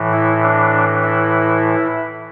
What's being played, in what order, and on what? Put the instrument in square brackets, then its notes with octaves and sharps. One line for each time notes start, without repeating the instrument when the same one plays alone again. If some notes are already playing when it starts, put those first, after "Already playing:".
Already playing: [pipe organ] A2 E3
E4
D4
E4